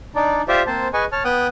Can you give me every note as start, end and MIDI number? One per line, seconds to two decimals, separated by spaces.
0.15 0.42 62
0.15 0.42 63
0.15 0.42 74
0.48 0.62 65
0.48 0.62 67
0.48 0.62 72
0.48 0.62 74
0.48 0.62 76
0.67 0.88 58
0.67 0.88 60
0.67 0.88 72
0.67 0.88 81
0.94 1.05 68
0.94 1.05 71
0.94 1.05 75
0.94 1.05 80
0.94 1.05 85
1.12 1.23 73
1.12 1.23 81
1.12 1.23 89
1.25 1.47 59
1.25 1.47 79
1.25 1.47 87
1.25 1.47 90